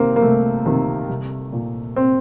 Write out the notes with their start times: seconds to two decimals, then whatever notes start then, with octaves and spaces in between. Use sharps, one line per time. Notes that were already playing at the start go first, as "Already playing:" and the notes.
Already playing: C3 D#3 A#3 C4
0.16 A#3
0.22 C2 A3
0.66 C3 D#3
1.09 C2
1.52 A#2
1.96 C4